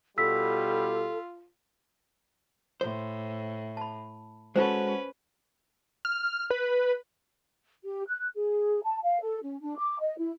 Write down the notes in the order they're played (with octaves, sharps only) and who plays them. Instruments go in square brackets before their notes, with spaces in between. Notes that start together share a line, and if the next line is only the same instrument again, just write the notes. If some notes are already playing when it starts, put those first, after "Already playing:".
[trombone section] B2 G3 [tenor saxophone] F4 [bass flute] A4 [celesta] E6 B6
[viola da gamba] A2 [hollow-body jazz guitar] C5
[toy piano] A5 B5
[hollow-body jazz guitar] G#3 F#4 A4 [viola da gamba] C#4 B4 [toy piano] C5
[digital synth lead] F6
B4
[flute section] G4
F#6
G#4
A5
F5
A4
C#4
D4
D6
D#5
E4